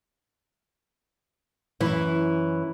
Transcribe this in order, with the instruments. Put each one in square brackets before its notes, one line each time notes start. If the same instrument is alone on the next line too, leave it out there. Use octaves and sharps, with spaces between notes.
[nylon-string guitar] F#2 E3 E4